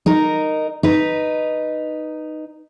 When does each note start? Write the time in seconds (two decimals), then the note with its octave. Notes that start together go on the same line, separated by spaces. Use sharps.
0.06 D#4 A#4
0.83 D#4 B4